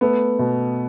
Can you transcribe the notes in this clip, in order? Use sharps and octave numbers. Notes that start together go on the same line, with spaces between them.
A3 B3
B2